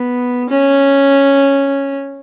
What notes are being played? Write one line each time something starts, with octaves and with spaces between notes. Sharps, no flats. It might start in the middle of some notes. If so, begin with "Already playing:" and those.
Already playing: B3
C#4